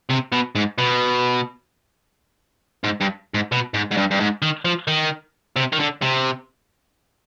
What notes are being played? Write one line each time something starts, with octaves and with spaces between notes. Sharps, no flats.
C3
B2
G#2
B2
G#2
G2
G#2
B2
G#2
G#2
G2
G2
G#2
D#3
F3
D#3
C3
D#3
D3
C3